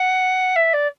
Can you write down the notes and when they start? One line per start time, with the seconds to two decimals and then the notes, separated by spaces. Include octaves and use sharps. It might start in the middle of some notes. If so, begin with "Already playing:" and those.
Already playing: F#5
0.55 E5
0.73 D5